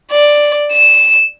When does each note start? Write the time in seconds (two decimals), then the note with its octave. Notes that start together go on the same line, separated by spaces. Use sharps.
0.12 D5
0.72 E7